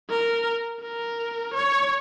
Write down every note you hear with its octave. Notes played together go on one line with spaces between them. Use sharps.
A#4
A#4
C#5